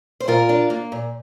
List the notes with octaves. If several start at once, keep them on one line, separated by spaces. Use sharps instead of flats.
C5
A#2 F4 A#4
D4
A#3
A#2